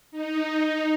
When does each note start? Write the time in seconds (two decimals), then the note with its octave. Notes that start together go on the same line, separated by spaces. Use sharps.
0.11 D#4